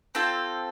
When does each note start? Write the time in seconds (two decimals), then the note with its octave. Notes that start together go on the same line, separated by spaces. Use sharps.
0.15 C4 F4 A4